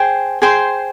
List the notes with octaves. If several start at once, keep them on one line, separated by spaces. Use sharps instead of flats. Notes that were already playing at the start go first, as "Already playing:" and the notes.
Already playing: G#4 C5 G5
G#4 C5 G5 C6